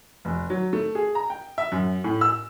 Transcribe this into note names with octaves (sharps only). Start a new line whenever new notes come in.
F1
F#3
A3
G#4
A#5
G5
E5
F#2
A2
E6